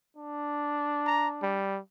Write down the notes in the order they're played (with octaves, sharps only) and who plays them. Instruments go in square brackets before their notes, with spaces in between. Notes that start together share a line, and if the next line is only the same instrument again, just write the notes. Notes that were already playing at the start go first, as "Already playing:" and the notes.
[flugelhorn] D4
[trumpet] A#5
G3